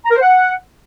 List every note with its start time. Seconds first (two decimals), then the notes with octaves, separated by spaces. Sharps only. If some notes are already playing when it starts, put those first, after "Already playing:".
0.05 A#5
0.11 A#4
0.16 C5
0.22 F#5